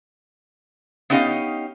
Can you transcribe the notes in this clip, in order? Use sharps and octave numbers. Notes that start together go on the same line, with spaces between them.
B3 C#4 D#4 G4 D#5 F5